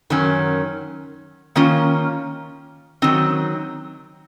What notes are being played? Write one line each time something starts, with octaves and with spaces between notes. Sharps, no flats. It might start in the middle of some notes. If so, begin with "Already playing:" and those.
F#2 D#3 F#3 C#4
D#3 A#3 C#4 F4
D#3 F#3 C4 D#4